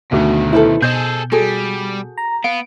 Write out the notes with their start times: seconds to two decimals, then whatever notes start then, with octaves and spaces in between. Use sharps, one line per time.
0.12 D2 B2 D#3 F#4
0.53 E4 A4 B4 C5
0.82 B2 G#4 A4 C5 D#5 G6
1.32 G3 F#4 G#4 A4
2.18 A#5
2.44 B3 F5 D7